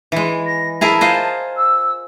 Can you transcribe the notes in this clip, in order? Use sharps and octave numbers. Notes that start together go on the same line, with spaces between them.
E3 G#3
A#6
E4 G#4 A#4 A5
F4 C5 D#5
E6